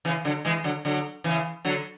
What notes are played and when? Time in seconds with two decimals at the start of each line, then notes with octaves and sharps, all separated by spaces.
0.05 C#3 E3
0.25 D3 F#3
0.45 E3 G#3
0.64 D3 F#3
0.85 D3 F#3
1.24 C#3 E3
1.65 D3 F#3